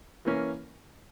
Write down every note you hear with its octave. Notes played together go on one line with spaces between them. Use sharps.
E3 A#3 C#4